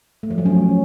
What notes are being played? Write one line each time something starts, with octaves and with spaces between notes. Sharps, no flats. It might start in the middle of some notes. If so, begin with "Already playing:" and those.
A3
F3
F#3
C#4